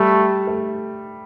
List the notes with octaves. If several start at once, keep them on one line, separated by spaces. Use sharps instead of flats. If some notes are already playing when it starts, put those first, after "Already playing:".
Already playing: G3 A3
A3